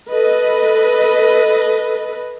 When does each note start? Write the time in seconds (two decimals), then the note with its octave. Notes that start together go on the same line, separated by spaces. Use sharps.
0.11 A4 B4 D#5